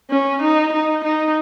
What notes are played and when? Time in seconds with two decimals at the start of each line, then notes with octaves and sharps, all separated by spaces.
0.10 C#4
0.42 D#4
0.73 D#4
1.04 D#4